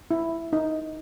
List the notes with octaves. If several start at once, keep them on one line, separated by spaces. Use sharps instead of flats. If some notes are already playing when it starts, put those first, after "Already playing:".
E4
D#4